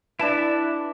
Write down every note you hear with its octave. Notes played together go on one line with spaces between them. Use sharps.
E3 D4 E4 A5